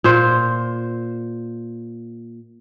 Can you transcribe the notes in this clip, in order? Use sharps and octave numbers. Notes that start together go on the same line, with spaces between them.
A#2 C5